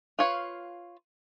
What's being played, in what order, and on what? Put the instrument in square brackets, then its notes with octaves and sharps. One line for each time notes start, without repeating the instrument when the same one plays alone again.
[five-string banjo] F4 B4 C#5 F5